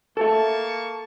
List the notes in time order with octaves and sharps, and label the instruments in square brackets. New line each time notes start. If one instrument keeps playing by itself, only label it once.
[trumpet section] A#3 A5 C#6 [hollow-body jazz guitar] A4 E5